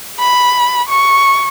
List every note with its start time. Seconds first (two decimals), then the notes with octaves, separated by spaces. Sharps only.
0.19 B5
0.89 C#6